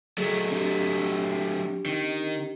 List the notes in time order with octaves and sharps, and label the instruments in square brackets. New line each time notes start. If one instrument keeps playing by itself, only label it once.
[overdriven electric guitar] F#3 A3 [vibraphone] G#4
[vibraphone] C4 D4 G4
[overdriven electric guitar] D#3